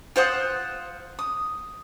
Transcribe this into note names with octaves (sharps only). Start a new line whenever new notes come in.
F4 C5 F#5 D#6
D#6